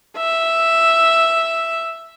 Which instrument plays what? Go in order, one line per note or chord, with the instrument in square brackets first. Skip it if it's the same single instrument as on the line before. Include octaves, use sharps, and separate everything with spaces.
[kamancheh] E5